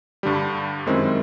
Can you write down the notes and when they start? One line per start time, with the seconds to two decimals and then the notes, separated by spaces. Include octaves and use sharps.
0.23 G2 D3 G3
0.86 F#2 D#3 G#3 C4 E4